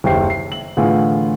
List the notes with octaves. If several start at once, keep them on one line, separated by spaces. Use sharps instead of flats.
F#1 D#2 E5 G5 C7
C7
F#7
A2 D3 E3 F4 G#4